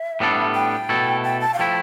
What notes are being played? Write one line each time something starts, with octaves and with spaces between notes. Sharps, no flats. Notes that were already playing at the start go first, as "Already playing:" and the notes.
Already playing: E5
A2 G3 B3 D4 A4
G5
B2 A3 E4 A4
G5
A5
F5
F3 A3 E4 G5